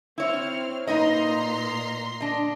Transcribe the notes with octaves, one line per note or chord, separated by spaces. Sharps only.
C4 E4 C#5 F6
A#2 D#4 B4 D#5 A#5 C6
D4 D#5